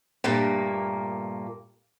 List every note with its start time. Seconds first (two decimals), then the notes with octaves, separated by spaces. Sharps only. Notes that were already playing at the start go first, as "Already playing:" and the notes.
0.24 G2 A#2 A3 A#3